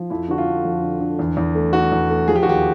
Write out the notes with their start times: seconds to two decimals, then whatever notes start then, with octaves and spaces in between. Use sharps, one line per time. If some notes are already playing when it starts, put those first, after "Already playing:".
Already playing: F3
0.10 F2 E4
0.28 D3 F#4
0.38 F4
0.47 D3
0.64 F2
0.82 D3
1.00 D3
1.19 E2
1.37 E2
1.55 A3
1.73 A3 F#4
1.92 E2
2.10 A3
2.28 F3 G#4
2.36 G4
2.43 F#4
2.46 D#2 G4